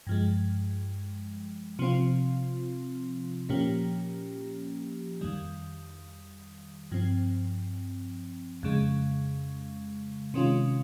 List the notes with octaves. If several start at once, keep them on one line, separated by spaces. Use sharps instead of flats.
G2 F3 G#3
C3 F3 C4 F4
A#2 F3 A#3 C#4 G4
F2 D#3 G3
G2 F3 C4
F2 C#3 G#3
C3 D#3 G#3 C#4 F4